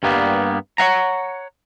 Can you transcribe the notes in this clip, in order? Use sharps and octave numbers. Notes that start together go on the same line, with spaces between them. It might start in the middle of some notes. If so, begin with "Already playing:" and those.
G2 G3 A#3 B3
C#5 F5 F#5 A#5